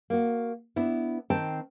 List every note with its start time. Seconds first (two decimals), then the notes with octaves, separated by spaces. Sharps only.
0.10 A#3 F#4
0.76 B3 D4 E4
1.30 D#3 C4 G5 A5